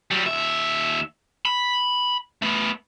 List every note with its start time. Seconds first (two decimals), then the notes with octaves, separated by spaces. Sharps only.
0.11 F#3 G3
0.26 D#2 E5
1.45 B5
2.42 A3 B3